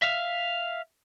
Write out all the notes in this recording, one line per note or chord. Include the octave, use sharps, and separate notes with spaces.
E5 F5